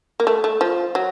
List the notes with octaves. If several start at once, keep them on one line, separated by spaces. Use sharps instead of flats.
A#3
A3
A3
F3
F#3